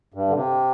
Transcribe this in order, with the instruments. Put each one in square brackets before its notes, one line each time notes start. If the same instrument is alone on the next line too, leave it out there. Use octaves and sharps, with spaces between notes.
[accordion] G2
D3
C3